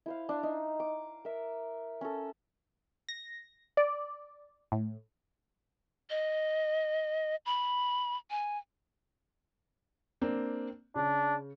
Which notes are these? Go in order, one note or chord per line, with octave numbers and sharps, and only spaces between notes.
E4 C5 F5
D4
D#4
D6
A#4 E5
C#4 A4
A#6
D5
A2
D#5
B5
G#5
A#3 C4 D4
C#3 D4